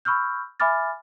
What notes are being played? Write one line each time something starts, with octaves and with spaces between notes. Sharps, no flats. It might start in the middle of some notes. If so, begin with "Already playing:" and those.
B5 C#6 E6 F6 G6
E5 G#5 B5 D6 F6 A6